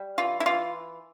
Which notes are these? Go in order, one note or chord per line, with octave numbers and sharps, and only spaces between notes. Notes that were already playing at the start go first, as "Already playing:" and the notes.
Already playing: G3
E3 F4
E4
E3 F4